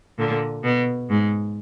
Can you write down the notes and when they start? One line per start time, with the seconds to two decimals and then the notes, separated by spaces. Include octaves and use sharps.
0.18 A#2 D3
0.63 B2
1.09 G#2